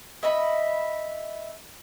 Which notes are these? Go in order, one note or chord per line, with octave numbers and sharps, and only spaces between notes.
D#5 E5 B5